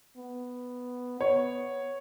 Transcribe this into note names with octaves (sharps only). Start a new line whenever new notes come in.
B3
B3 C#5